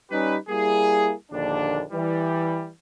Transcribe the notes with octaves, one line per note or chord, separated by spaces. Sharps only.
G3 C#4 D#4 G4 B4
G3 A#3 E4 G#4
A#1 D#2 D3 D4
E3 G3